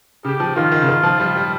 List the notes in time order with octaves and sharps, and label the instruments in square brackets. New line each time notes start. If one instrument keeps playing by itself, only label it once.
[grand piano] C#3 [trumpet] G4
[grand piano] F3
[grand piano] D#3 [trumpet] F4
[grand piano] D#3
C#3
D#3
F3
G3
G3